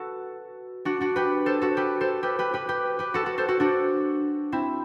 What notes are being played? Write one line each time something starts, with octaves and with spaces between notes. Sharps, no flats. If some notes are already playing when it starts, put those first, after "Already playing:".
Already playing: F#4 A4 B4
D4 F#4
D4 F#4
G4 B4
A4 C5
F#4 A4
G4 B4
A4 C5
G4 B4
G4 B4
G4 B4
G4 B4
G4 B4
F#4 A4
F#4 A4
A4 C5
F#4 A4
D4 F#4
C4 E4